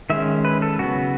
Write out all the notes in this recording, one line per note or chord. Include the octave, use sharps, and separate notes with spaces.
D#3 G#3 C#4 E5
B4
A4
C#3 F#3 B3 F#4